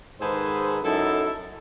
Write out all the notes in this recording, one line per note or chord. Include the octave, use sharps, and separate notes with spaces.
G#2 D#3 G#4 A4 B4 C5
F#2 D#4 E4 A4